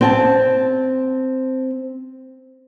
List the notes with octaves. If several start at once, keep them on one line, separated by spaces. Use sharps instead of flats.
C4 G#5 A5